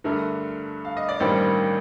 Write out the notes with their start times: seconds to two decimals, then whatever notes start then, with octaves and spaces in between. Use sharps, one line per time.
0.04 G2 D3 A3 A#4
0.85 F5
0.97 D#5
1.09 D5
1.20 A1 G2 D#3 G3 A#3 C5